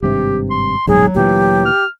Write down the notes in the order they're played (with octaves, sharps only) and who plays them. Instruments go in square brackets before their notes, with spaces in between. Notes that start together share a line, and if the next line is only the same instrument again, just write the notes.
[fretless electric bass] G#1 G2 C3 [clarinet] G4
[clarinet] C6
[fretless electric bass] D#1 B1 G#2 [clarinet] F#3 [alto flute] G#4
[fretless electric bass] D2 A#2 E3 [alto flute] G4
[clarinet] F6